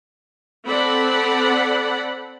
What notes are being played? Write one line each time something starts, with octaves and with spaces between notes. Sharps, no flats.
C4 A4 D5 F#5 B5